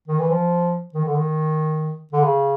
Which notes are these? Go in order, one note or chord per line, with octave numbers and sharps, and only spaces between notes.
D#3
E3
F3
D#3
D3
D#3
D3
C#3